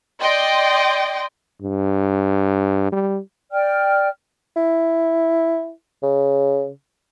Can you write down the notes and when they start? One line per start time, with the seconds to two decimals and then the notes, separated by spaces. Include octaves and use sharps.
0.21 D5 D#5 G5 C6
1.62 G2
2.93 G3
3.52 D5 G5 F6
4.56 E4
6.03 C#3